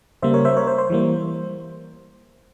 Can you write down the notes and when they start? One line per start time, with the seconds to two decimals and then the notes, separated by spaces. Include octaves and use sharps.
0.22 C#3 G3 A#3 C5 E5
0.34 A#4 C#5
0.45 C5 E5
0.56 A#4 C#5
0.67 C5
0.78 C5
0.90 E3 G3 A#3